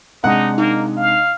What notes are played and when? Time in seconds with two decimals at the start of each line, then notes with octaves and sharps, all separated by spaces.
0.24 C3 G#3 D4 D#4 F#5
0.58 A#3 D#4
0.97 F5